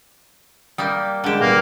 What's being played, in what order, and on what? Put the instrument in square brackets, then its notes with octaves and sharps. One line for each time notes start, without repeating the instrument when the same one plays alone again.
[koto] G3 A#3 [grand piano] D#6 G6
[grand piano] D2 G#3 E7 [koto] D3 G4
[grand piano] A#2 G3 B3 [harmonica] A#3